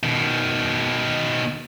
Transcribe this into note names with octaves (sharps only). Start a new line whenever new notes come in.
B2 D#3